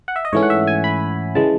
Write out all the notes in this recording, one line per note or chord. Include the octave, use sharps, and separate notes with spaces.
F#5
E5
D#5
G#2 E3 A3 C#4 C#5
F#5
E5
G#5
B5
C#3 E3 G#3 A5